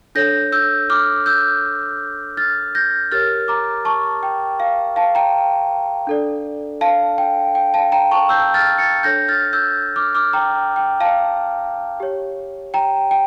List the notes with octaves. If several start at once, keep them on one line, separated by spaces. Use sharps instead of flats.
D4 A4 C#5 G6 A#6
E6 G6
D6 F6
E6 G6
F6 A6
G6 A#6
G4 A#4 C#5 F6 A6
A#5 D6
A5 C#6
G5
F5
F5 A5
G5 A#5
D4 A4 D5
F5 A5
G5
G5
F5 A5
G5 A#5
A5 C#6
E6 G6
F6 A6
A6 C#7
D4 A4 C#5 G6 A#6
F6 A6
E6 G6
D6 F6
D6 F6
G5 A#5
G5
F5 A5
G4 C#5
G5 A#5
G5